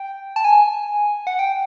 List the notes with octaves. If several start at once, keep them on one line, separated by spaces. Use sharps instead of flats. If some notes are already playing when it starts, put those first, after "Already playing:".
Already playing: G5
A5
G#5
F#5
G5